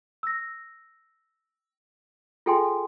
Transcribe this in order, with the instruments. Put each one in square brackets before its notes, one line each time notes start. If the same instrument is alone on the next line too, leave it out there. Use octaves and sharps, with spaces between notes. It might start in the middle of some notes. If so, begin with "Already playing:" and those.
[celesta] E6 A#6
F4 G#4 A4 G5 G#5 C6